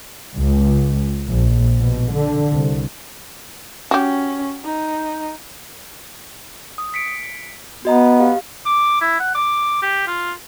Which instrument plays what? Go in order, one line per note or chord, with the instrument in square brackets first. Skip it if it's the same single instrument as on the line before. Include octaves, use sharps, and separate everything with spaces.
[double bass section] C#2
A#1
B2
D3
C2
[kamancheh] C#4 [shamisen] F#4 G4
[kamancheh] D#4
[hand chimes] D#6
B6 C#7 D7
[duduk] B3 [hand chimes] F#4 D#5 A#5
[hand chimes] G4 F5
[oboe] D6
E4
F#5
D6
G4
F4